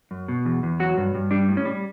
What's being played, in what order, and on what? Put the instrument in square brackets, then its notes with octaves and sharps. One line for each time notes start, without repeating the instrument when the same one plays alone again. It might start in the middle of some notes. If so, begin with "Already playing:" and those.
[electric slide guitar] F#2
B2
E2
E2
F#3 F#4
G2
G2
G3 D4
A2
C#4
G3